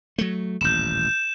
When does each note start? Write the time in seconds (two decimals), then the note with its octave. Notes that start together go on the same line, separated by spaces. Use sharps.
0.18 F#3 A3
0.61 D#1 A1 G6 E7